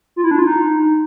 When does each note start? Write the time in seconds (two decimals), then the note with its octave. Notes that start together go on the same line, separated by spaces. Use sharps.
0.16 F4
0.24 E4
0.31 D4
0.39 F4
0.46 D#4